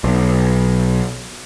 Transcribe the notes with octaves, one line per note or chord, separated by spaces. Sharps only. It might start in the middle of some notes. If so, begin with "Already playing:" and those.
B1